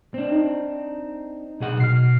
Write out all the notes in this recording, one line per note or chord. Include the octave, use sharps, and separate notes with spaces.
C4 D4
D#4
B1 G#4 F#5
B2 F6 C7